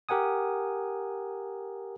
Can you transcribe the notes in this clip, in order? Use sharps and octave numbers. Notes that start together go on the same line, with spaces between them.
G4 A#4 F#5 G#5 D#6